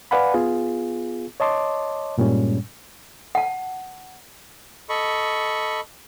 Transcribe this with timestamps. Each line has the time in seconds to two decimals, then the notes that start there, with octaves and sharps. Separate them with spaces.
0.11 B4 D5 F5 F#5 G#5 B5
0.34 B3 F4 G#4
1.40 C#5 D#5 A5 C6 D6
2.18 G2 A#2 G3 G#3 C#4
3.35 F#5 A5
4.89 A4 D#5 B5 C#6